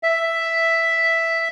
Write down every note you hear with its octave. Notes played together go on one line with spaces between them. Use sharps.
E5